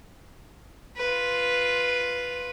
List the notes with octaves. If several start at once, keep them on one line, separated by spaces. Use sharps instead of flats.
F4 B4